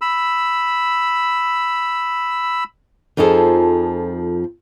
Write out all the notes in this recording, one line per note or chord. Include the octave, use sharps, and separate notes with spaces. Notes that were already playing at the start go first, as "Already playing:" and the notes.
B5 E6
F2 F3 D#4 G#4 A4 C5